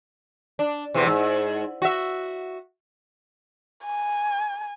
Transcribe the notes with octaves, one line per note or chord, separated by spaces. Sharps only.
D4
E2 C3 E3
G#2
F#4 E5
G#5